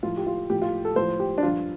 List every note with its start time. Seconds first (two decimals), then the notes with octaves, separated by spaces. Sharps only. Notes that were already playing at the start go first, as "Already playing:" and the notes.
0.03 A2 F3 F4
0.17 G4
0.26 F4
0.50 A2 F3 G4
0.62 F4
0.85 A4
0.96 A2 F3 C5
1.20 G4
1.38 D4
1.43 G2 F3 F4